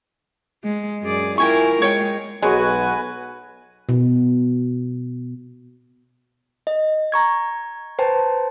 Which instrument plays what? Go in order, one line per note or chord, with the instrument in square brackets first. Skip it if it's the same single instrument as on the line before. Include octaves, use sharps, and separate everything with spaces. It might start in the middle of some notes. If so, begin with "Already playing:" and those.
[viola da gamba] G#3
F#2 G#4 D5
[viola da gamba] E4 F4 A#4 [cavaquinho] G5 G#5 C#6
[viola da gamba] G#3 [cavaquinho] C#5 G5
[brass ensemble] B1 F#4 [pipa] G#3 [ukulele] G#4 A#4 C#5 [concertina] B4 G#5
[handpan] B2
[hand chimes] D#5
A#5 C#6 G#6
B4 C5 G5 A5